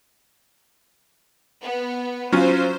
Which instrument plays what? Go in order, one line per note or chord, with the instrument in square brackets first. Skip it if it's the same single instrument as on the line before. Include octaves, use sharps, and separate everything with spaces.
[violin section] B3
[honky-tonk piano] F#3 C#4 F4 [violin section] C5